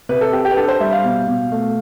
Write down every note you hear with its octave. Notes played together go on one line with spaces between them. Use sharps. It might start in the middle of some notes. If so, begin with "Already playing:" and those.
C3 B4
A4
C4 G4
G4
B4
D4 A4
C5
G3 E5
F5
B2
B2
A3